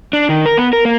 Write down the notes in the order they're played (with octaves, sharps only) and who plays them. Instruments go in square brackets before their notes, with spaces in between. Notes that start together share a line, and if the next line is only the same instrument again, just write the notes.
[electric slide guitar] D4
D#3
A#4
B3
A#4
A#3